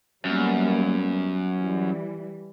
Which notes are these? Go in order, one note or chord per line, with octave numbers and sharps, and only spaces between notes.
F#2 G3 A#3 B3
E3 G3